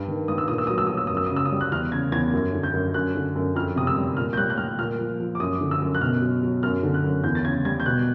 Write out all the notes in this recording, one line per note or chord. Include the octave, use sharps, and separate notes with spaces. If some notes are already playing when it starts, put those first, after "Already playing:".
Already playing: G2
D#3
G2 D#6
E6
A#2 D#6
E6
F#3 D#6
E6
F#3 D#6
E6
F#2 D#6
E6
D#6
C#3
E6
D#6
G3
F#6
E2 F6
C#3 G#6
E2 G#6
F#2
D3
G6
F#2
F#2 F#6
D3
F#2
F2 F6
C3 D#6
E6
G3
A#2 F6
G6
G3 F#6
F#6
G3 F6
A#2 F6
F3
F3
D6
F#2 D#6
D3
E6
F#2
F#6
B2 F6
F#3
F#3
F#2 F6
D3
F#6
F#2
E2 G6
A6
C#3 G#6
G3 G#6
G6
B2 F#6